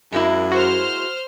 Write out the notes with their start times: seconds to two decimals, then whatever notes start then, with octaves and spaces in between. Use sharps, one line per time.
0.12 F#2 G#3 A#3 E4
0.52 F#4 C5 F6